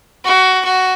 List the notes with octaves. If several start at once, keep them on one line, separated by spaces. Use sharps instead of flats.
F#4
F#4